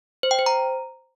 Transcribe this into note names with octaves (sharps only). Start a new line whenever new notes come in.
C5
G5
C5
A#5